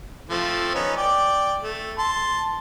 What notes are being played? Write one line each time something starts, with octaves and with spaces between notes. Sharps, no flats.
F3 A3 C4
B3 C#4 D#4
D5 G5
A3
A5 C6